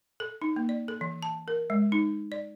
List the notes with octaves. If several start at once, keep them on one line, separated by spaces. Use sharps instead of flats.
A4
D#4
A#3
D5
A4
E3
A5
A#4
G#3
D#4
D5